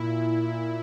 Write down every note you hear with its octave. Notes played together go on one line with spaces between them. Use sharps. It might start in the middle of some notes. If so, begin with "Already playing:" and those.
Already playing: A#2 E4